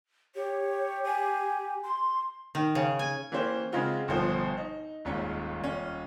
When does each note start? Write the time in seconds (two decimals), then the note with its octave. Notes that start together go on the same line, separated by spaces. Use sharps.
0.35 G4 C#5
1.05 G#5
1.83 C6
2.55 D#3
2.75 C#3
2.99 G#5
3.32 E3 A#3 C#4 G4 C5
3.72 C#3 G#3 C4 F4 F#4
4.08 G1 B2 F3 C5
4.57 D#4
5.05 D#1 D#2 G#2 C#4
5.61 D#1 C#4